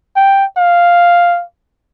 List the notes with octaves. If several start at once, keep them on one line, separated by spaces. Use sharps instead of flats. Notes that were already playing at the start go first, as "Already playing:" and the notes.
G5
F5